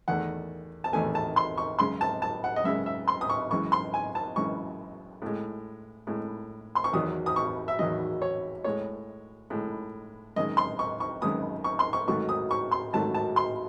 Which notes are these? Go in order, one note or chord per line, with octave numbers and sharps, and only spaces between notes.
E2 D#3 A3 F#5
A5
E2 D#3 A3 G#5
A5
C6
C#6
F#2 C#3 G#3 C6
A5
A5
F#5
D#5
F#2 C#3 G#3 E5
E5
C6
D#6
C#6
F#2 E3 G#3 C#6
C6
G#5
A5
F#2 E3 G#3 C#6
A2 G#3
A2 G#3
C6
C#6
E2 D#3 F#3 D#6
D#6
C#6
E5
E2 D#3 F#3 D#5
C#5
A2 G#3 C#5
A2 G#3
F#2 D#3 G#3 D#5
C6
C#6
C#6
F#2 D#3 G#3 D#6
C#6
C6
C#6
G#2 D#3 F#3 A3 C#6
D#6
C#6
C6
G#2 D#3 F#3 A3 A5
A5
C6